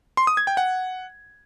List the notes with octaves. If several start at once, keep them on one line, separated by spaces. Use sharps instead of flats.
C6
D#6
G#6
G5
F#5